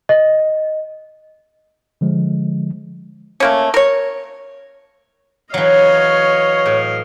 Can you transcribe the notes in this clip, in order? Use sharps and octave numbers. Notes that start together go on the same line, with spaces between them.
D#5
D3 F3 G#3
A3 A#3 C#4
A#4 C#5
E3 F#3 C#5 D#5 F5
A2